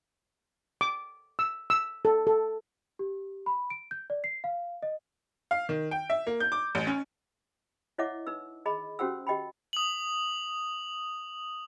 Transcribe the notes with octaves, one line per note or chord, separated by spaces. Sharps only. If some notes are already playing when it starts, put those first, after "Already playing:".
D6
E6
E6
A4
A4
G4
B5
D7
G6
D5
C7
F5
D#5
F5
D#3
G5
E5
A#3
G6
D6
A1
C#4
E4 C#5 D#5 E5 F#5 D6
D#4 B4 E6
G#4 D#5 A#5 B5
C#4 F#4 G4 C5 F#5 E6
G4 D#5 G5 B5
D#6 F#7